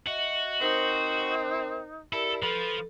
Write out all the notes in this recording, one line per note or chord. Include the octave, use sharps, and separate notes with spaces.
F#4 D#5 E5
C4 D#4 A#4 C5
E4 G4 A4 A#4 D5
F3 A4 B4